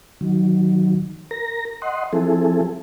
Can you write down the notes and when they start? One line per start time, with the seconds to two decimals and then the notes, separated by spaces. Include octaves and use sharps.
0.21 D#3 F#3
1.31 A#4 A#6
1.82 D#5 F#5 C6
2.13 F3 C4 E4 G#4 A4